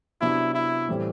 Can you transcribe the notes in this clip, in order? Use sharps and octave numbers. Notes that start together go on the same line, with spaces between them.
C3 F#3 B3 D4 E4 G4
E4
A2 E3 G3 C4